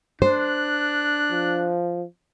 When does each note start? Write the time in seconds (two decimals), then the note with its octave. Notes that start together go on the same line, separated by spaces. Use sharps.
0.22 D4 C5 F#6
1.31 F3